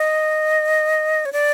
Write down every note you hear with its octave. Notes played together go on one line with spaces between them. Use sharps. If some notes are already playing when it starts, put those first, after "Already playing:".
Already playing: D#5
C#5
D5